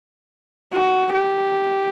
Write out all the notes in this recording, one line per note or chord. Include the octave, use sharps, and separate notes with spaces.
F#4
G4